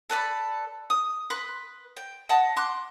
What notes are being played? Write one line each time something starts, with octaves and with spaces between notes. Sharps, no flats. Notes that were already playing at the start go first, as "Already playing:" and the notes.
A4 B4 D5 B5
D#6
B4 C6 F#6
G5
D#5 F#5 A5
C6 D6 F#6